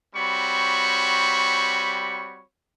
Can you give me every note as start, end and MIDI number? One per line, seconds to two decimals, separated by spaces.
0.15 2.44 55
0.15 2.44 60
0.15 2.44 66
0.15 2.44 73
0.15 2.44 83
0.15 2.44 85